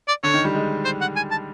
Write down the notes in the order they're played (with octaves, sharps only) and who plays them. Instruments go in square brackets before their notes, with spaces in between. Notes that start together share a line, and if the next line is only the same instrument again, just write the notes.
[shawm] D5
[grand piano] D3 [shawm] C#5
[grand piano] D#3
G3
G#3
[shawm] C5
F#5
G#5
A5